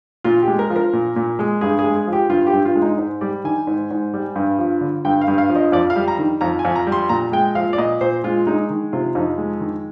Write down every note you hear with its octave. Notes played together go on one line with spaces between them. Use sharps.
A#2 F4
G4
G#3
A#4
F3
A#4
A#2
A#2
G#3
G2 G#4
G#4
G#3
G#4
F3
G4
G2 F4
G4
G2
F4
G#3
D#4
G#2
G3 D5
D#3 G#5
G#2
G#2
G3
G2
F3
D3
G2 G5
F5
G2
F5
F3
D#5
F2 D5
F5
G3
A#5
D#3
F2 A#5
G#5
F2
A#5
G3
C6
A#2 A#5
G#3 G5
F3 F5
D5
A#2 D#5
A#2 C5
G#3 F4
G#3 D#4
D#3
C3 F4
F2 D#4
G#3
D#3